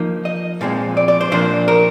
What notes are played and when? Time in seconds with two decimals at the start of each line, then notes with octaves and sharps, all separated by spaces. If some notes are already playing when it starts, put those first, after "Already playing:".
Already playing: F3 A#3 D#4
0.25 D#5
0.61 A#2 F3 G#3 C4
0.97 D5
1.08 D5
1.21 C5
1.32 A#2 F3 A#3 D4 C5
1.68 A#4